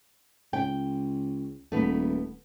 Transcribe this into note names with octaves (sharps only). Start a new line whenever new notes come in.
C#2 G5
D#1 A3 B3